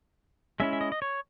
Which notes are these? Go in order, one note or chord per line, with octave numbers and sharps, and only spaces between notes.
G#3 C#4 E4 E5
E5
D#5
D#5
C#5